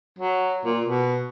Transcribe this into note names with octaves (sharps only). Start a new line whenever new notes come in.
F#3
A#2
B2